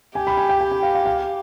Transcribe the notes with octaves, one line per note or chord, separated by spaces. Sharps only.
G4 G#5
B5
G#5
G5
G5
G5
F5
F5
F5